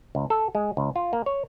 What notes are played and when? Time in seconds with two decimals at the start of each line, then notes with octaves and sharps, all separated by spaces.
0.15 C#2
0.30 A4
0.55 G#3
0.77 C#2
0.96 F4
1.13 A#3
1.26 C#5